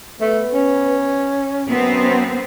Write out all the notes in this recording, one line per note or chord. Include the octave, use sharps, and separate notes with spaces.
A3 B3
C#4
F#2 B3 C4